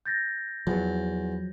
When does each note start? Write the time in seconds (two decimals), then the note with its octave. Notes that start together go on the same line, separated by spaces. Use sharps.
0.06 G6 A6 A#6
0.67 E2 F3 F#3